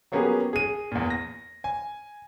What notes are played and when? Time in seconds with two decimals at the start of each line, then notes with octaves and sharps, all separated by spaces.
0.12 F#3 A#3 B3 C#4 G4 G#4
0.53 G#4 D#7
0.92 E2 A#2
1.10 A#6
1.64 G#5